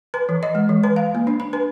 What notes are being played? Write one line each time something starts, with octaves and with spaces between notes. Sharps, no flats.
B4
E3
D#5
G#3
E3
B4
F5
A#3
D4
B5
B4